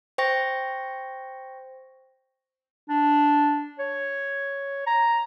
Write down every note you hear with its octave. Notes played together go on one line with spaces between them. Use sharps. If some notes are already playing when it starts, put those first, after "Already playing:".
C5 G5 C#6 A#6
D4
C#5
A#5